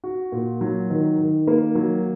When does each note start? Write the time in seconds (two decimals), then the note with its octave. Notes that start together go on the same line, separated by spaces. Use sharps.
0.04 F#4
0.32 A#2
0.61 F#3
0.90 D#3
1.19 D#3
1.47 A#3
1.75 F#3